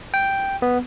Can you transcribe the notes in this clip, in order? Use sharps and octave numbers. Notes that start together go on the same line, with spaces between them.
G5
B3